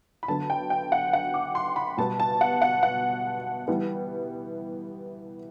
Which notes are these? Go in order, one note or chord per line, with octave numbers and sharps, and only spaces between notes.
B5
D3 F#3 B3 A5
G5
G5
F#5
F#5
D6
C6
B5
B2 G3 B3 A5
A5
F#5
F#5
F#5
E3 G3 B3